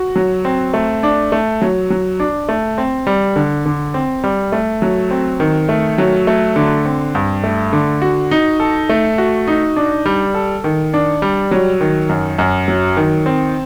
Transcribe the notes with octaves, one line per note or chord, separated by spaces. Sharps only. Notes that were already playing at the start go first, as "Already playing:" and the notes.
Already playing: F#4
F#3
C4
A3
D4
A3
F#3
F#3
D4
A3
C4
G3
D3
D3
C4
G3
A3
F#3
C4
D#3
A3
F#3
A3
D3
C4
G2
A3
D3
F#4
D#4
A4
A3
F#4
D#4
D4
G3
A4
D#3
D4
G3
F#3
D#3
F#2
F#2
F#3
D#3
C4